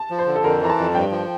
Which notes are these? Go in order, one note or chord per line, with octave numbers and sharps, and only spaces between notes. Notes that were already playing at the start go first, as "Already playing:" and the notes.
Already playing: A5
F3
C5
D3
A4
F2 A#4
E3 A#5
A5
F2
G2 G5
F3